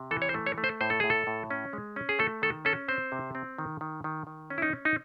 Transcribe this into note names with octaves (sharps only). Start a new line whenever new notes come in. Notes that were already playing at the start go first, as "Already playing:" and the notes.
Already playing: C3
E3 A4
C#5
C5
A3
C#5
A3
C5
A2 C5
A4
A2 G#4
A4
A2
C#4
G#3
C#4
G#4
A3 A4
D#3 A4
C#4 A4
C4 C5
C3
C4
D#3
D#3
D#3
D#3
C#4
E4
D#4
C#4
D#4